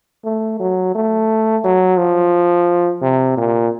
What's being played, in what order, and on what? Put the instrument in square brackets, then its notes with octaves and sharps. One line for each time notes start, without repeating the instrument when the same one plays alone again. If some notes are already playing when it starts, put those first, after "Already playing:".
[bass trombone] A3
F#3
A3
F#3
F3
C3
A#2